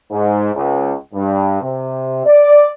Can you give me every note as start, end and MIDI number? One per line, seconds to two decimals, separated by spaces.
0.11 0.49 44
0.54 0.93 37
1.14 1.58 43
1.62 2.23 48
2.26 2.71 74